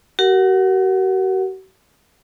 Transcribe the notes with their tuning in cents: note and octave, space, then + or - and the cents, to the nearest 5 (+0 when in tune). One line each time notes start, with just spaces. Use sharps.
F#4 +45 A#4 +0 F#5 +0